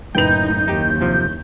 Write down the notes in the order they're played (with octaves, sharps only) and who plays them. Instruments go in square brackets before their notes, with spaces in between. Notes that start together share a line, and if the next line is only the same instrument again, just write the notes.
[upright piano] F#1 B4 F7 [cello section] A2 D#4 [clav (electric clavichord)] G5 [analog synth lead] G6
[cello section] D#2 [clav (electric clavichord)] D#4 G4
[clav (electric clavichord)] C3 F3